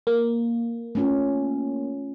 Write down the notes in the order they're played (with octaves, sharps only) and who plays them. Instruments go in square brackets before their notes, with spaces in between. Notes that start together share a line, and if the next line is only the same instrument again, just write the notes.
[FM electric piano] A#3
[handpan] A3 C#4 F4